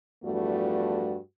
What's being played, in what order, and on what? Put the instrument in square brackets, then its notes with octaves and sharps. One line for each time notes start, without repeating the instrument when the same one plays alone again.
[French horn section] E2 G2 F3 A3 F#4